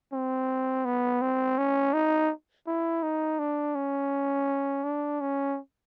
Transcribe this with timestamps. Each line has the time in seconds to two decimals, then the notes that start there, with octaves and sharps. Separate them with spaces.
0.13 C4
0.85 B3
1.22 C4
1.58 C#4
1.94 D#4
2.67 E4
3.03 D#4
3.39 D4
3.75 C#4
4.84 D4
5.21 C#4